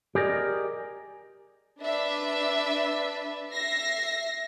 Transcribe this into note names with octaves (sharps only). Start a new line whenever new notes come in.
G4 G#4 A#4 D5 D#5
D4 B4 E5
E5 A#6 C7